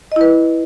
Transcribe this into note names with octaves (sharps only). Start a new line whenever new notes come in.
E4 B4 D#5